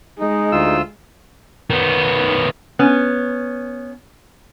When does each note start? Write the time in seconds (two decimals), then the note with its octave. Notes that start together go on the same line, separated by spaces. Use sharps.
0.20 G#3 D#4
0.52 D2 F4 E6
1.70 D#3 B3
2.79 B3 C#4